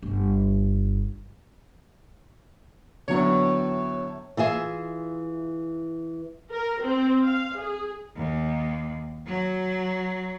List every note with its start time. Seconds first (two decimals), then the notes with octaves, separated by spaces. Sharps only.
0.02 G1
3.08 A2 D3 F#3 B3 C#5
4.37 E3 F4 G#4 E5
6.51 A#4
6.82 C4
7.22 F5
7.57 G#4
8.16 D#2
9.26 F#3